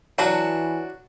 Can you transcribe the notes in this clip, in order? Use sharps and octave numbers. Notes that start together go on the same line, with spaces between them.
E3 F#3 D4 F#4